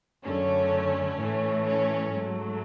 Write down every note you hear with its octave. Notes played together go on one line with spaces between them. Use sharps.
F#2 D3 A3 C#4
A2 E3 A3
C#4
G#2 F#3 A3